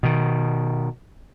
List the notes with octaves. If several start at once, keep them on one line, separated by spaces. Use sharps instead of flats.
B2 D#3